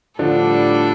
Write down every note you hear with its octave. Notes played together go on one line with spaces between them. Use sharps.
A2 D3 F3 G3 D4 A4